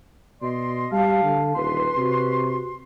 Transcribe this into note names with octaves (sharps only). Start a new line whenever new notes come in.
B2 D5 D#5 C6
G3 F5 A5
D3
D#1 B4 C6
C3 F#4